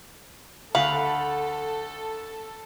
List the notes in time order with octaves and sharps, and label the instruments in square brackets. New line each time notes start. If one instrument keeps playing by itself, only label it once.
[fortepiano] D2 [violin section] A4 [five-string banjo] F5 [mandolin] F#5 B5